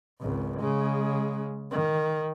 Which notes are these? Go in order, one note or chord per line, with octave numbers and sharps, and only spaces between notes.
G#1 C#2
C#3 G#3
D#3